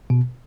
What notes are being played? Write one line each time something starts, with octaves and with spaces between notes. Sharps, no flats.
B2